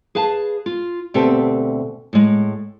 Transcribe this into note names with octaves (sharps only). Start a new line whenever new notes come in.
G#4 B4 F5 A5
F4
D2 B2 C4 G4 A4 E5
A2 G#3